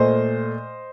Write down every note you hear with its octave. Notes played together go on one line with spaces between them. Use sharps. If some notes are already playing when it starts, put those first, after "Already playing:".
Already playing: A#2 A3 C5 D#5